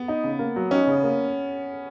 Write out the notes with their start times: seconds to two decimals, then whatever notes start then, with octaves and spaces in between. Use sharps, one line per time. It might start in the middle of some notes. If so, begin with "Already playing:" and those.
Already playing: B3
0.08 D#4
0.24 C#3
0.39 A#3
0.56 F#3
0.71 C#4 D#4
0.87 C#3
1.03 A#3